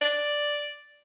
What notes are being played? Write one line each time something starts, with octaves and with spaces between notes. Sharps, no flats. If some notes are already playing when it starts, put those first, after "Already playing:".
D5